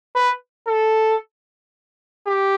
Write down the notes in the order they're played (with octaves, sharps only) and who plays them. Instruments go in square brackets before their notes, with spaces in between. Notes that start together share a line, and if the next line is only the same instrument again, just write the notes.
[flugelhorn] B4
A4
G4